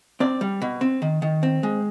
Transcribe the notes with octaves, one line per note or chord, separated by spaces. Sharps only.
C4 D5
G3
B2
C4
D#3
D#3
C4
G#3